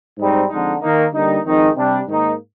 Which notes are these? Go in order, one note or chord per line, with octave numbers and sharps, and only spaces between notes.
G#2 G3 C4 D#4
F2 D3 G#3 D#4
D#3 A#3 D#4
D3 G3 A#3 D#4
F2 D#3 G#3 D#4
C3 G3 D4
G#2 D#3 A#3 D#4